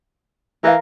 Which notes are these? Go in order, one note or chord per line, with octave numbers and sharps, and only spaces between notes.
E3 A#4 F5